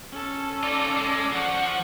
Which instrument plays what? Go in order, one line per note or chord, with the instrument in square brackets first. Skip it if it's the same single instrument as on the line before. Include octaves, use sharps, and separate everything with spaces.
[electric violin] C#4 A4
[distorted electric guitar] D#4 F4 [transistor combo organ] D5
[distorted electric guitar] G#3
[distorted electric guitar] F3 [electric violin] F#5 C#6